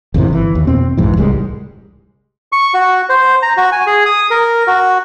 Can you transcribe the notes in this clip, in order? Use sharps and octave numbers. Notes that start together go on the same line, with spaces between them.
G#1 F2 C3 E3
G1 E3
D#2
F2 B2 C4
A#1 F2 G#2 E3
D1 C2 G3 G#3
C#6
F#4
C5
A#5
F#4
G#5
G#4
D#6
A#4
F#4